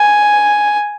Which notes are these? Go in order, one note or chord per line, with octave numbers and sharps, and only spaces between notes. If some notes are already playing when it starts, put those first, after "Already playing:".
Already playing: G#5